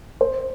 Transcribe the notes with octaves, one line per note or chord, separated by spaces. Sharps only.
C5